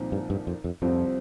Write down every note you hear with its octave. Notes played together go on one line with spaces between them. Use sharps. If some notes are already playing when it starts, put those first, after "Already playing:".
Already playing: C2 A#2 F3 C4 D#4
G2
G2
F2
F2
C2 F2 C3 F3 C4